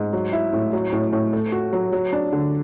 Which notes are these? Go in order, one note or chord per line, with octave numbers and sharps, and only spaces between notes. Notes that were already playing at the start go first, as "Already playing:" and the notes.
Already playing: G#2
F#3
E4
A2
F#3
A2
A2
A3
F#4
F#3
F#3
D4
D3